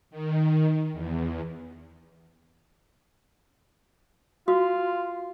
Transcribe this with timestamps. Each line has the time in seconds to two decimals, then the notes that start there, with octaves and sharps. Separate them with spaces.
0.10 D#3
0.93 E2
4.48 F4 F#4